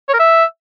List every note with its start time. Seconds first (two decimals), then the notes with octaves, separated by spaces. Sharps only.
0.09 C#5
0.14 A#4
0.19 E5